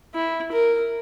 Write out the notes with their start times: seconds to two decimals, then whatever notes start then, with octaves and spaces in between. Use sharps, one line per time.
0.14 E4
0.52 A#4